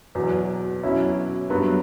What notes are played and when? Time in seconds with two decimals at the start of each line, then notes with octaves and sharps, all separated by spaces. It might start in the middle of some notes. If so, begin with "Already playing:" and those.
0.15 E2 B2 F#3
0.83 B2 F#3 C#4 E4
1.50 G2 F#3 B3